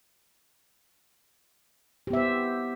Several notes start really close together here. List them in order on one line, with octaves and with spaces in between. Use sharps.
G4 B3 E5 C5